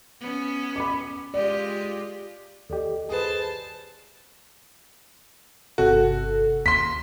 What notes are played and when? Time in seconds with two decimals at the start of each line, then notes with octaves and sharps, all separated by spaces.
0.20 B3 C#4
0.76 B5 D6
1.34 G#3 F4 G4 D5
2.70 D#2 G4 A4 D5 D#5
3.09 G#4 B4 C5 A5
5.78 G1 C3 F#4 A4
6.66 D#2 C6 B6